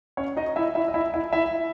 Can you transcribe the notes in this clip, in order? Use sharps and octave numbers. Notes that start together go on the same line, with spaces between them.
C#4 C#5
D#4 D#5
E4 E5
E4 E5
D#5
E4 E5
E4 E5
E4 E5